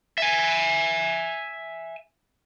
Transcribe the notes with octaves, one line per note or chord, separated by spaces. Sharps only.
E5 G#5